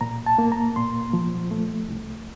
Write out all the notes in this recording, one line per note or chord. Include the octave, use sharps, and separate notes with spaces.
A#2 A#5
A5
A#3
A#5
A#2 C6
F3
A3
C2